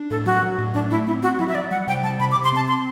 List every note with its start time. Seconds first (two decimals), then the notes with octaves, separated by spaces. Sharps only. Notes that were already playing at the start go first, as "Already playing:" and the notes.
Already playing: D4
0.10 A2 A4
0.26 F#3 F#4
0.42 F#3
0.58 A2
0.74 A2 D4
0.91 A3 E4
1.07 C4 E4
1.23 C4 F#4
1.39 F#3 E4
1.49 E5
1.55 F#3 D5
1.71 G3 F#5
1.87 C3 G5
2.03 G3 A5
2.20 C3 B5
2.31 D6
2.36 C3
2.44 C6
2.52 C4 A5
2.68 C6